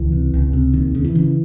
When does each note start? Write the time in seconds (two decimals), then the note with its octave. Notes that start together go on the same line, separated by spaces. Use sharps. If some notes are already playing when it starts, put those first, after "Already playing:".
Already playing: C#2 E3
0.12 C3
0.34 C#2
0.53 C3
0.73 D#2 D#3
0.95 C#3
1.04 E3
1.15 C#3